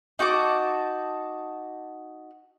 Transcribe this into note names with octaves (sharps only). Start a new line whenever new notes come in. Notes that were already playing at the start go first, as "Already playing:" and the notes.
D#4 F#4 A5 D6